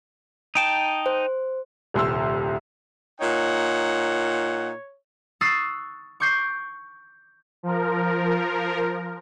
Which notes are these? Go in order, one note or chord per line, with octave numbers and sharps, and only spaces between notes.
D#4 G5 A5
C5
D#1 C2 C6 E6
A#2 D#4 C#5 F#5
C#6 D#6 E6 F#6 A6 C7
C#6 D6 G6 C7 C#7
F3 A#4